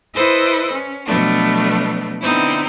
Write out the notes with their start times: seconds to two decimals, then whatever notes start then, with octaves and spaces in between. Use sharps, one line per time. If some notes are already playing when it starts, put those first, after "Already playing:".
0.13 E4 A4 B4 C5 D#5
0.72 C#4
1.06 B2 F3 F#3 A3 B3 D4
2.21 D3 B3 C4 D#4 E4